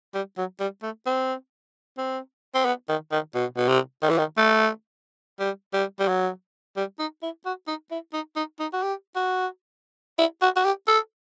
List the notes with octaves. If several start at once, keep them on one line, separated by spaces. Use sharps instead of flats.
G3
F#3
G3
A3
C4
C4
C4
B3
D#3
D#3
B2
B2
C3
D#3
E3
D#3
A3
G3
G3
G3
F#3
G3
D#4
E4
F#4
D#4
E4
D#4
D#4
D#4
F#4
G4
F#4
E4
F#4
F#4
G4
A4